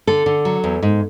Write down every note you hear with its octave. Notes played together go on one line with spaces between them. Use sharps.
D3 A4
D3
F#3
E2
G#2